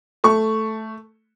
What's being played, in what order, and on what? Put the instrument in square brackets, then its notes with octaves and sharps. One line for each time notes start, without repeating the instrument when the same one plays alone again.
[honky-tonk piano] A3 C#6